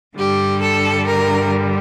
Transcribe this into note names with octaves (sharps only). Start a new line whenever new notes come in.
G2 D3 G3 G4
A4
A#4